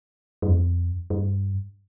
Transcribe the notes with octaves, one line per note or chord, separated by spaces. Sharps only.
G2
F2
G2